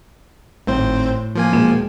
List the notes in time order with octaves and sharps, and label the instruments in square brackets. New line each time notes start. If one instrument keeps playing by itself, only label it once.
[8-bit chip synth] G#1 C4 C5 [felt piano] A2
[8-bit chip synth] F3 A#3 G#5
[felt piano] E1 A#2 E7